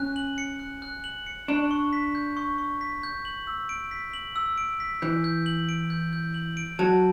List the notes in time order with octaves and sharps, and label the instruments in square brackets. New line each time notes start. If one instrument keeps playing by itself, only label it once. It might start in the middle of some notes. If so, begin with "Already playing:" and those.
Already playing: [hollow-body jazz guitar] C#4 [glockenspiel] F#6
[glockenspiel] F#7
C#7
F#6
F#6
F#7
C#7
[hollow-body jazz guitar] D4 [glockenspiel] C#6
[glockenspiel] C#6
B6
G6
C#6
C#6
B6
G6
F#7
E6
D7
B6
F#7
E6
D7
B6
[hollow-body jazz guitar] E3 [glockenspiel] G6
[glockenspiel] G6
F#7
D7
G6
G6
F#7
D7
[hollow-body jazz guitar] F#3 [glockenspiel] A5